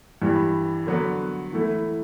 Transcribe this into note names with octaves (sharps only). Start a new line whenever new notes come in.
G2 E3 G3
D3 F#3 B3 F#4
E3 A3 E4